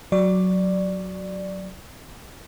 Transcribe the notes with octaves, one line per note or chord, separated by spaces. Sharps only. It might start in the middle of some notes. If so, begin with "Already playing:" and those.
F#3 D5